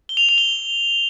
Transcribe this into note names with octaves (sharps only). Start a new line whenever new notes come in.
G7
F7
F7
G7